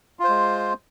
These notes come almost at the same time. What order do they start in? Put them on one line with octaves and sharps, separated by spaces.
F4 C5 G#3